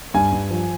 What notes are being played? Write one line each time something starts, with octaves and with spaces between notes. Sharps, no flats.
G2 G#5
G2
F3